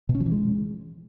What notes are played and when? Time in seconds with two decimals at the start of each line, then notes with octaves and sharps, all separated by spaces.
0.09 B2
0.15 C#4
0.20 F3
0.26 E3
0.32 G#3